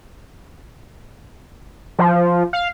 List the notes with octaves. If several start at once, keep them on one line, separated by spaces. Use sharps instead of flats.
F3
F5